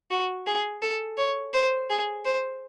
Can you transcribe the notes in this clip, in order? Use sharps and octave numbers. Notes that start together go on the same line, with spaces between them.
F#4
G#4
A4
C#5
C5
G#4
C5